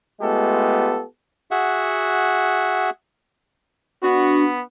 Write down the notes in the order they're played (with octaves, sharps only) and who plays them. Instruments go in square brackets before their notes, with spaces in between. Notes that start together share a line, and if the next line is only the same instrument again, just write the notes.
[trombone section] G#3 A3 B3 F4 G4 A4
[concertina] F#4 G#4 E5 F#5
[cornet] B3 [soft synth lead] D4 [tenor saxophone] F#4